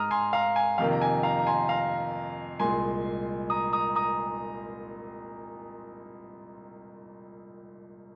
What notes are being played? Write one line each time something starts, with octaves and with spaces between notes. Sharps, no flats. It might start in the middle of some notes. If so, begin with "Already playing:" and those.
Already playing: G#2 G#3 A#5 D#6 F6
G#5 C6
F5 A#5
G#5
F2 C3 D#3 A#3 F5
A#5
G#5
F5 A#5
A#5
G#5 C6
F5 A#5
C2 A#2 G#3 G#5 C6
A#5 D#6
A#5 D#6
A#5 D#6